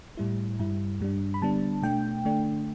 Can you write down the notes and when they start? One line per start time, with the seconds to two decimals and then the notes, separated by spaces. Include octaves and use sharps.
0.17 A2 G3 E4
0.59 G2 G3 E4
1.00 G2 G3 D4
1.34 B5
1.42 D3 G3 B3 D4 A5
1.82 B2 A3 D4 G5
2.25 D3 A3 D4